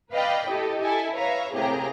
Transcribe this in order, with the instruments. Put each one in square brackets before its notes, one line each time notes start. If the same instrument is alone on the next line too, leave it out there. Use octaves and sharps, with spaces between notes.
[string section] B4 D5 D#5 F5 G5 B5
E4 G4 A4 D#5
E4 A4 G#5
B4 C#5 E5 F5 A#5
A2 C3 A#3 G4 G#4 A#5